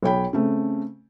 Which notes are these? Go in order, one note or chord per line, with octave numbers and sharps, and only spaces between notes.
B1 C#5 G5 B5
C#3 A3 C4